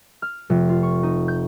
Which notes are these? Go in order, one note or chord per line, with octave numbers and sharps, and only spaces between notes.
F6
F1
F4
C#6
D#4
G6